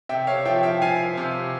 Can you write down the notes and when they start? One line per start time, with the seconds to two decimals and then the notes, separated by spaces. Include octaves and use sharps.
0.09 C3 E5 G5
0.27 C#5 F5
0.45 F3 E5 G5
0.63 E5 G5
0.82 F3 F5 G#5
1.17 C3